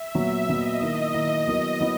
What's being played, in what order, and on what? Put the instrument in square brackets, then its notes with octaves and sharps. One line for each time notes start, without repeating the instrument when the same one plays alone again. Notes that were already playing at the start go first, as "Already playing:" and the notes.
Already playing: [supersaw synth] E5
[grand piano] A#2 F#3 B3
[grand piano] A#2 F#3 B3 [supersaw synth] D#5
[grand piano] D#3 A#3 E4
D#3 A#3 E4
[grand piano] F#3 B3 E4 A#4 [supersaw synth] D#5
[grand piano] F#3 B3 E4